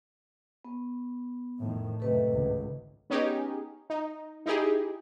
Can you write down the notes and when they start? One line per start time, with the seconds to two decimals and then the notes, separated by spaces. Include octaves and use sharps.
0.65 B3
1.59 F2 A2 D#3
2.00 F#2 C3 A3 A4 B4 D#5
2.30 G#1 C#2
3.10 B3 C#4 D#4 G4 G#4
3.90 D#4
4.46 D#4 E4 G4 G#4